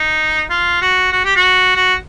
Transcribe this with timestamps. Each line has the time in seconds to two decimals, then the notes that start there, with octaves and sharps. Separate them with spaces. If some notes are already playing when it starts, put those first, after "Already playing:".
Already playing: D#4
0.50 F4
0.82 F#4
1.12 F#4
1.25 G4
1.36 F#4
1.76 F#4